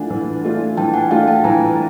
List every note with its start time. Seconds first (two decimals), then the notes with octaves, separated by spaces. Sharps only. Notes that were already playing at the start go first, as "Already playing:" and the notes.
Already playing: E3 A3 D4 F4 F#5 G#5
0.10 E3
0.44 A3 D4 F4
0.77 E3 G5 A5
0.94 F#5 G#5
1.11 A3 D4 F4 F5 G5
1.28 G5 A5
1.44 E3 G#5 A#5